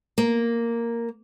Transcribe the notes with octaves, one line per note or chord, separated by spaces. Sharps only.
A#3